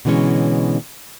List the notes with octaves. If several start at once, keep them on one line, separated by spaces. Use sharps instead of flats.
B2 D3 E3 G#3 C#4 C#5